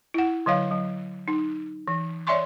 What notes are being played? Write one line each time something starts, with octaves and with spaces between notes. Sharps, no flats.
E4 F#5
D3 F#3 C#5 F5
F#3
D#4
E3
C#5 D5 E5 G#5 C6 C#6